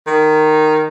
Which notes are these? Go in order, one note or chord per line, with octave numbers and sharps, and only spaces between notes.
D#3